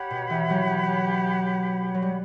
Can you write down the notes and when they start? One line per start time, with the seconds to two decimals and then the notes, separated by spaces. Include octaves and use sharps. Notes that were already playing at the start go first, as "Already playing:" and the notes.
Already playing: G4 C#5 F#5 B5
0.11 B2
0.30 E3
0.50 F#3
1.94 F#3
2.02 G3